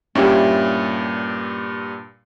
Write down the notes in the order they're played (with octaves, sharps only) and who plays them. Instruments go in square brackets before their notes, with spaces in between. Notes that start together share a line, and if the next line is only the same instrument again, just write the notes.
[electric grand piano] G2 A#2 [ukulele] C#4 E4 G4